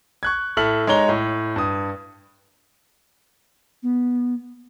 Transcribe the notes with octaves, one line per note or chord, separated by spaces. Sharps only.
C#6 F#6 G#6
A2 A4 E5 F6 F#7
G#3 D#4 C#5 A#5 G7
A2
G2 D#6
B3